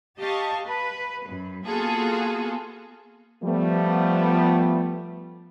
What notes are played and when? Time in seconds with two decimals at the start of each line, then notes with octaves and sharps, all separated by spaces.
0.18 G4 D#5 F5 A5 C#6
0.64 B4
1.27 F#2
1.67 A#3 B3 F4 F#4 G#4 A4
3.44 F3 G3 A3 B3